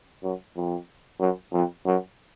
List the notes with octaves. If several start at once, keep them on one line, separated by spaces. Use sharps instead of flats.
F#2
F2
F#2
F2
F#2